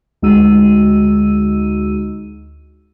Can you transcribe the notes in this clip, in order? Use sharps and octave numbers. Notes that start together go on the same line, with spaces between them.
D2 G#3 D#4 F#4 E6 D#7